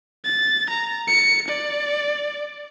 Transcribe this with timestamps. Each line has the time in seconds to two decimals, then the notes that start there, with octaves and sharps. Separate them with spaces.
0.24 A6
0.70 A#5
1.07 C#7
1.48 D5